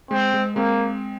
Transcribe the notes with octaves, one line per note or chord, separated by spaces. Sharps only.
G#3 C4
G#3
G#3 A#3 C4